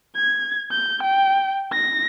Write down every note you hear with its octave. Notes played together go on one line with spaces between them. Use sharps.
G#6
G6
G5
A#6